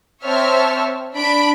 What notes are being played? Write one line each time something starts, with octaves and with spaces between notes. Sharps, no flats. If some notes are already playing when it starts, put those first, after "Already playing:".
C4 C5 C#5 E5 A5 F6
D4 B5 D7